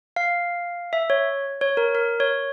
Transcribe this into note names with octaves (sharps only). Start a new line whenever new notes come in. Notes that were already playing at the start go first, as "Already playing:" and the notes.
F5
E5
C#5
C#5
A#4
A#4
C#5